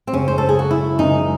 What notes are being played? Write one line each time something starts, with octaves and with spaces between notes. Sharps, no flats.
C4
F#1 F#2 C#3 G#3 C#4
C5
A4
G#4
F#4
E4
F#1 F#2 C#3 G#3 D#4